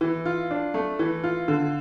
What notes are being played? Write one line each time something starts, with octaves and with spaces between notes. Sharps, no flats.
E3
F4
D4
A3
E3
F4
D3